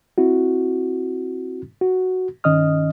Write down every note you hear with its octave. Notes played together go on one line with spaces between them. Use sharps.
C4 E4 F#4
F#4
G2 D#3 C#4 D#5 D#6 F6